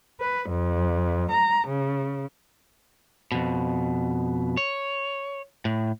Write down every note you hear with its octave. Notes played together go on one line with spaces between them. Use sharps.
B4
F2
A#5
C#3
F2 B2
C#5
A2